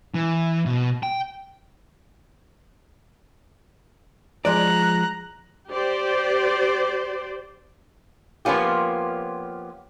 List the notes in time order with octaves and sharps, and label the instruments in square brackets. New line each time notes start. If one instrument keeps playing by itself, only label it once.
[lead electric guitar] E3
B2
G5
[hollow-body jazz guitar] F3 G#3 D5 [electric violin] A#5 F#6
[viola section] G4 C5 D5
[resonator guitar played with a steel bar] F3 A#3 B3 C#4 F4 G4